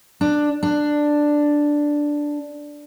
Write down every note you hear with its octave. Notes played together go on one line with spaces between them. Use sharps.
D4
D4